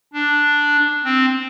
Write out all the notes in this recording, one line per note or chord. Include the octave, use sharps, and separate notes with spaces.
D4
C4